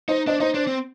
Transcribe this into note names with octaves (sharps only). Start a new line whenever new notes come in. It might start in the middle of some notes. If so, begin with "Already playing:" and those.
D#4 C5 D#5
D4 C5 D#5
D#4 C5 D#5
D4 C5
C4